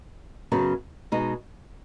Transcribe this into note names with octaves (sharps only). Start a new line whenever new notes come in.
F#2 C#3 F#3 B3
B2 G#3 D#4